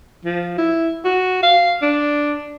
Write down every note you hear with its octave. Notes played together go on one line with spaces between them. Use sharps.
F3
E4
F#4
F5
D4